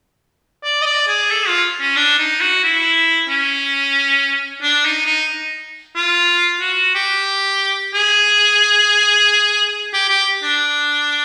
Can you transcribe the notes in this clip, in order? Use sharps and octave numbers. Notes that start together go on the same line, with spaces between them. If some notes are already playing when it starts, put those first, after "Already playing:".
D5
D#5
D5
G#4
A4
F4
C#4
D4
D#4
F#4
E4
C#4
D4
D#4
D#4
F4
F#4
G4
G#4
G4
G4
D4